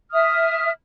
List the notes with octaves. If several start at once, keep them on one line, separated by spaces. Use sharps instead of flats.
E5 D#6 F6